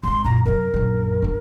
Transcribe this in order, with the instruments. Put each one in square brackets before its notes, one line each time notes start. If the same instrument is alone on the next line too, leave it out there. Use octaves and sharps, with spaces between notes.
[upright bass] G#1 G#3 [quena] C6
[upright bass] F#2 A#2 [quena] A#5
[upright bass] F#2 C3 [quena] A#4
[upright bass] A#1 F#2
G2 B3